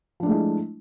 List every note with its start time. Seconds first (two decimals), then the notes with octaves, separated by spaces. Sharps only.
0.20 F3
0.23 D4
0.26 A3
0.29 G#3
0.32 E4